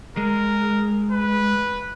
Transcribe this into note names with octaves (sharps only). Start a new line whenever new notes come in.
G#3 A#4
B4